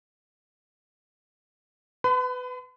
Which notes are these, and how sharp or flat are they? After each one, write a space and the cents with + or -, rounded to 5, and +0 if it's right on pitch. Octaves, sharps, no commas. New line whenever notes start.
B4 +20 B5 +45